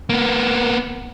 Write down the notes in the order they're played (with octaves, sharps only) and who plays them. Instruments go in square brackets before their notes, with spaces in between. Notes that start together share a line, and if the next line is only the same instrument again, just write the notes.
[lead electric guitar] A#3 B3